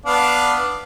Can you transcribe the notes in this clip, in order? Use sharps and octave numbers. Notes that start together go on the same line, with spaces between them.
B3 D4 F5